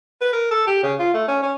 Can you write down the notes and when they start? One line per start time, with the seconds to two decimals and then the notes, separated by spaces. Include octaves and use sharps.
0.22 B4
0.33 A#4
0.51 A4
0.67 G4
0.83 C#3
0.99 F4
1.14 A3
1.28 C#4
1.43 C#4